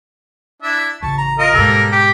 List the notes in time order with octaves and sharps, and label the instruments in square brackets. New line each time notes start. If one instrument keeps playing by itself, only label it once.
[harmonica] D4 E4 E5
[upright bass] A1 C#3 [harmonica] A5 C#6
[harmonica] A#5
[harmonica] F4 D#5 [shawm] A#4
[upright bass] G#2 B2 [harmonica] G3 A#3 A4
[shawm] G4